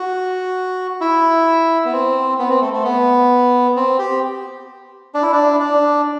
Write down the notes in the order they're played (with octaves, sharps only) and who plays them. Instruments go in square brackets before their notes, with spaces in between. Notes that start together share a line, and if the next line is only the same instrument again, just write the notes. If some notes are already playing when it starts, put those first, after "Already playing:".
Already playing: [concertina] F#4
E4
B3
C4
B3
C4
A3
A3
B3
C4
G4
D4
E4
D4
D4